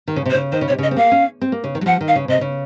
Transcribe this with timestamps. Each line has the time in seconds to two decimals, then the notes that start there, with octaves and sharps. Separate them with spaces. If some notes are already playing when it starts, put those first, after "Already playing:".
0.08 D#3
0.16 C#3
0.25 C3
0.30 C5
0.35 C#3
0.52 D#3 C5
0.61 C#3
0.68 C3 C#5
0.79 C#3 D#5
0.91 C4
0.96 A#3 F5
1.12 C#4
1.41 C4
1.52 A#3
1.64 C#3
1.75 D#3
1.81 F#3
1.86 F3 F#5
2.01 D#3
2.08 F5
2.16 C#3
2.28 C3 D#5
2.41 C#3